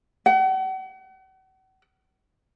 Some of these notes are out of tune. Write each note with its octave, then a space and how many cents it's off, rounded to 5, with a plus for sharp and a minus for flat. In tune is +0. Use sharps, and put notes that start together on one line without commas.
F#5 +40